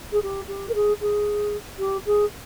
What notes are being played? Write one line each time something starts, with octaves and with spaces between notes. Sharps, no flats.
G#4
G4
G4
A#4
G#4
G#4
G4
G#4